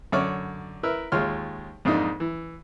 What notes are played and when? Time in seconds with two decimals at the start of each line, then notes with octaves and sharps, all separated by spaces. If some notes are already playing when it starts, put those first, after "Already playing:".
0.12 F#2 D3 C#5 D5 D6 F6
0.83 E4 A#4 B4 E5
1.12 D#2 G#3 F4 C#5 C6 F6
1.85 F2 G#2 A#3 D4 D#4
2.20 E3